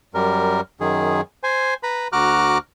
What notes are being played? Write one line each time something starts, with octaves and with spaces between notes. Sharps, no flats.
F#2 G3 A#4
F#2 D#3 G#4
C5 G#5
B4 A#5 B5
D2 F#4 A#5 D6 F6 F#6